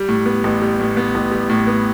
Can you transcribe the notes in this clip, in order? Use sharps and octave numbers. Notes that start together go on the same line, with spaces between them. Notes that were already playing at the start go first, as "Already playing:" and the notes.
Already playing: G3
A2
B3
A1
G3
A2
B3
A1
G3
A2
B3